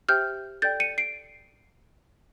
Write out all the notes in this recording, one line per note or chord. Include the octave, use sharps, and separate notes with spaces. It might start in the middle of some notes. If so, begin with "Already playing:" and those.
G4 C5 E5 G5 F6 G6
A4 D5 G5 G6 A6
C#7 D#7
C7 D7